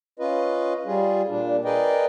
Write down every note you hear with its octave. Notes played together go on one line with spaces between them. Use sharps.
C#4 F4 B4 D#5
G3 F4 G#4
A#2 D4
G#4 A#4 B4 D5 D#5 G5